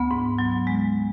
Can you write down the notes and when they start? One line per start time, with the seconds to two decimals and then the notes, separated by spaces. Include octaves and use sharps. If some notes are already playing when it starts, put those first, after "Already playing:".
Already playing: D2 B3
0.11 G#2
0.39 F#3
0.67 G#3